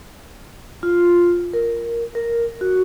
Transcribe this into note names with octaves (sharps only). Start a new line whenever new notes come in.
F4
A#4
A#4
F#4